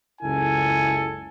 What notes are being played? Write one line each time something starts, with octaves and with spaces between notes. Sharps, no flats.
F#1 C#2 E4 A4 G#5